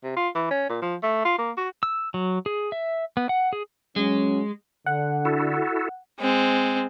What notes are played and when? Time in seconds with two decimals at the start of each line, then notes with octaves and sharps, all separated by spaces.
0.03 C3
0.16 F4
0.35 E3
0.51 C#4
0.69 A#2
0.82 F3
1.03 A3
1.25 F4
1.38 A#3
1.57 F#4
1.83 E6
2.14 F#3
2.46 G#4
2.72 E5
3.17 B3
3.29 F#5
3.53 G#4
3.96 F#3 G#3 C#4
4.86 D3 F#5
5.25 E4 F#4 A4
6.20 G#3 C4